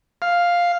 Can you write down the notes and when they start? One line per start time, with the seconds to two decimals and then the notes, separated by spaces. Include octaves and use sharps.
0.22 F5